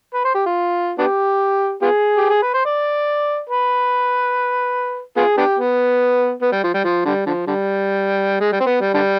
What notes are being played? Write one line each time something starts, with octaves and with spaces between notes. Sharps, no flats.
B4
C5
G4
F4
B3 D4 G4
B3 F4 G#4
G4
G#4
B4
C5
D5
B4
B3 F4 G#4
B3 D4 G4
B3
B3
G3
F3
G3
F3
D3 G3
D3 F3
D3 G3
G#3
G3
C4
B3
G3
D3 G3